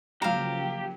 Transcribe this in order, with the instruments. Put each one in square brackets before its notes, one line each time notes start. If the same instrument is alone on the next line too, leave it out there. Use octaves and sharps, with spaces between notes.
[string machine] C#3 F3 A#3 [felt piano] F#3 E7 [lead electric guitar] G4 [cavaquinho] F5 A#5